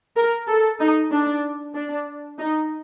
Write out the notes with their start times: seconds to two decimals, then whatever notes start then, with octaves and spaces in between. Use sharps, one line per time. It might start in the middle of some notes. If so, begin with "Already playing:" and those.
0.16 A#4
0.47 A4
0.79 D#4
1.11 D4
1.74 D4
2.39 D#4